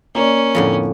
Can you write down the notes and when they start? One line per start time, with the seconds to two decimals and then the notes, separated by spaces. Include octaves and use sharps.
0.15 A#3 C#4 D5
0.55 F2 A2 D3